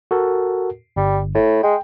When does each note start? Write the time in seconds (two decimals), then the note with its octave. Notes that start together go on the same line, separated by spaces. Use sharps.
0.11 F#4 A4 A#4
0.96 G1 G3
1.35 A2
1.63 G#3 G5